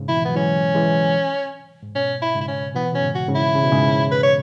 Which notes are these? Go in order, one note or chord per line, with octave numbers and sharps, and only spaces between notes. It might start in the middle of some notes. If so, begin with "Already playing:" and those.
Already playing: G#2 C#3
B2 E3 E4
F#3 B3
E3 G#3 C#4
E3 G#3
G#2
B2 C#4
E4
G#2 C#3
E4
C#4
B2 E3 B3
B2 C#4
G#2 C#3
F#4
G#2 C#3
E4
C#3
B2
G#2 C#3
B4
C#5